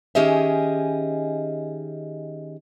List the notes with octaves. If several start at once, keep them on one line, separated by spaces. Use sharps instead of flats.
D#3 C#4 G4 G#4 D#5 E5